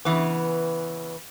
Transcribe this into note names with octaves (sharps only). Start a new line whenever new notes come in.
C#3 E3 B3